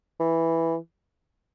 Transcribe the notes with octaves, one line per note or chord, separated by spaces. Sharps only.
E3